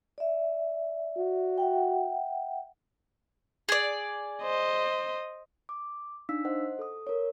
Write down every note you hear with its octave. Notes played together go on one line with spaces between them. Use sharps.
D5 E5
F#4
E5 F#5 G5
G#4 D5
C5 D#5
D6
D4 D#4 F5 E6 B6
C5 D#5 F#5
A4 D#6
A#4 C#5